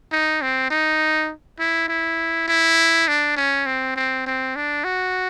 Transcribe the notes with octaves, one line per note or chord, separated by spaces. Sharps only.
D#4
C4
D#4
E4
E4
E4
D4
C#4
C4
C4
C4
D4
F#4